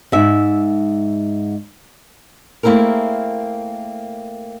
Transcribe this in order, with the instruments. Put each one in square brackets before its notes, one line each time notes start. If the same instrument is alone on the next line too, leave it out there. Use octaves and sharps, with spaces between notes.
[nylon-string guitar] G#2 E5
A3 A#3 C4 E4 G#4 A#4